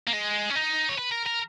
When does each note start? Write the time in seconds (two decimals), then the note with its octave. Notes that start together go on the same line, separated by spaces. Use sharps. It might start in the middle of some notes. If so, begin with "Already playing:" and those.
0.07 A#3
0.13 G#3
0.50 C#4
0.55 D#4
0.89 C#5
0.98 B4
1.12 A#4
1.26 A#4